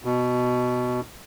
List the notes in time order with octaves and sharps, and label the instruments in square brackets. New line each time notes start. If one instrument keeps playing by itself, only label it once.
[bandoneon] B2